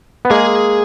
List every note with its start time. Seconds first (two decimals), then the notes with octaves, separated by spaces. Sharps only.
0.25 B3
0.30 G#3 A#3 G#4